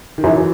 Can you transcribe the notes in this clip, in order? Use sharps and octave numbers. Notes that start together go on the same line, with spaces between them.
D#3
F#2 E3